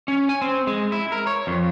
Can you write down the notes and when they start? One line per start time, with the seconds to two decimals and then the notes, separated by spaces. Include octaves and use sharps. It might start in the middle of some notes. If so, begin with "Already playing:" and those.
0.08 C#4
0.29 G#5
0.41 C4
0.67 G#3
0.92 E4
1.12 A#4
1.27 C#5
1.47 F2